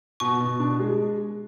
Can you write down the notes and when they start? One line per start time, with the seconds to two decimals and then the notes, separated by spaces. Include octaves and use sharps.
0.20 B2 C#6
0.40 B2
0.60 D4
0.79 G#3